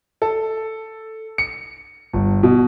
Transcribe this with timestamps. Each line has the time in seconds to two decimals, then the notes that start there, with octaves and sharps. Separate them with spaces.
0.22 A4
1.38 C#7
2.13 G1
2.43 B2